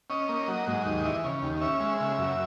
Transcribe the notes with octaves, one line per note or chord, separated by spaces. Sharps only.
C#4 D#5
A#3
F#3
G#2
D#2
E3
C#3
D#2
C#4 E5
G#3
C#3
F#2